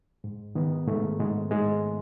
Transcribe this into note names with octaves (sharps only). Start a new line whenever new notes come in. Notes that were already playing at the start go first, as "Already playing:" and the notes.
G#2
D#3 B3
G#2 A3
G#2 G#3
G#2 G#3